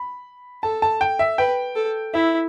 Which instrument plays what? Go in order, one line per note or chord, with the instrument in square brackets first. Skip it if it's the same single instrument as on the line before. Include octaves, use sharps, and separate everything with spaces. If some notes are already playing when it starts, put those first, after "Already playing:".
Already playing: [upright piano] B5
[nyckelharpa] A4 [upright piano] A5
[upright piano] A5
G5
E5
[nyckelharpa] B4 [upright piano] G5
[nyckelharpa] A4
[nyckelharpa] E4 [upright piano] E5